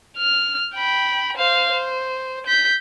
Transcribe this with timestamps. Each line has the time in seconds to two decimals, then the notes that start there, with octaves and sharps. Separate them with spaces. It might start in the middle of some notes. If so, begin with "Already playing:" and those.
0.17 F6
0.75 G5 B5
1.36 C5 F5
1.71 C5
2.46 G6 B6